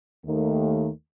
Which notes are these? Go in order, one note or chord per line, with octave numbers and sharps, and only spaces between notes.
D#2 D#3 A3